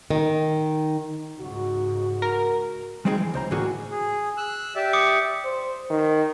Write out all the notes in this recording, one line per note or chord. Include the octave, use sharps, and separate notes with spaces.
D#3
C#2 G#2 F#4
A#4
G3 G#3 C4 D#4 F4 G#4
E3
C#2 C5 A#5
A2 D3 E3 A#3 F#4 G#4
G#4
E6 F#6
G4 D5 E5
D6 D#6 C#7
C5
D#3